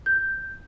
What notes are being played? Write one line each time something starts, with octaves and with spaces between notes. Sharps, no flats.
G6